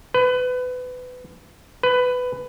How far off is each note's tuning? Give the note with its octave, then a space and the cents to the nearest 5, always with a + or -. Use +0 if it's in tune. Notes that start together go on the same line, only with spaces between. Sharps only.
B4 +25
B4 +15